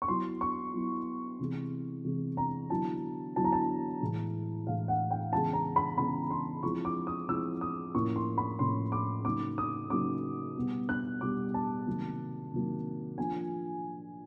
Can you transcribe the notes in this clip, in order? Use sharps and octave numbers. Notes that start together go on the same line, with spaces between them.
C#6
F#3 B3 E4 C6
C#6
F#3 B3 E4
C3 E3 G#3
C3 E3 G#3
A#5
D3 F#3 B3 E4 A5
D3 F#3 B3 E4 A5
A#5
A5
A2 E3 G#3
A2 E3 G#3 F5
F#5
G5
C#3 E3 G#3 B3 A5
A#5
B5
C#3 E3 G#3 B3 B5
C6
F3 G#3 C4 E4 C#6
D6
D#6
F3 G#3 C4 E4 E6
D#6
A2 F3 A#3 C#4 E4 C#6
C6
B5
A2 F3 A#3 C#4 E4 C6
D6
C#3 F#3 A#3 D#4 D6
D#6
C#3 F#3 A#3 D#4 D6
B2 G3 B3
F#6
B2 G3 B3 D6
A5
C3 D#3 F#3 A#3
C3 D#3 F#3 A#3
F3 A#3 D4 F4 G#5